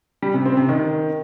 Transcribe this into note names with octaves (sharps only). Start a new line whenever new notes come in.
G3
C3
C4
C3
D#3